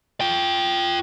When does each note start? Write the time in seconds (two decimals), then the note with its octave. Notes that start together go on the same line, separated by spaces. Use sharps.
0.21 F4 G5